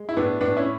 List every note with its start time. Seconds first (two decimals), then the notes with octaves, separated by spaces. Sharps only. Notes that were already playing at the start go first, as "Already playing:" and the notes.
Already playing: G#3
0.09 E4
0.17 A2 B3 D4
0.40 A2 B3 D4
0.57 C#4 E4